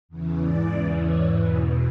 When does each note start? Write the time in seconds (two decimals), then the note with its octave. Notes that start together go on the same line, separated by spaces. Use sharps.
0.09 E2 C#3 E3
0.41 G#2 E3 D5
0.73 E2 C#3 E3
1.05 G#2 E3 C#5
1.37 E2 B2 B4